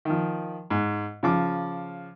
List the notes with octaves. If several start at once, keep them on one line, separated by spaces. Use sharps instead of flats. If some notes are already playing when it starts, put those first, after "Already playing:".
D#3 F3
G#2
C#3 F3 D6